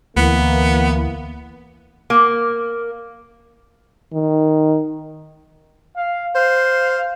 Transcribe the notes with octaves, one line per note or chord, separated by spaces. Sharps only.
D2 E3 A#3 B3
A#3
D#3
F5
C5 F5